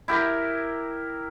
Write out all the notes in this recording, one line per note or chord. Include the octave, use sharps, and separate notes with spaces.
E4 G4 A#4